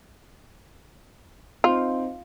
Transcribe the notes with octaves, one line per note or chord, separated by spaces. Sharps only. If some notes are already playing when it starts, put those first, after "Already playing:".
C4 D#4 F4